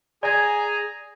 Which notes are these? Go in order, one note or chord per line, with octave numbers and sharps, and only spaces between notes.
G#4 D5 G#5 A#5 G#6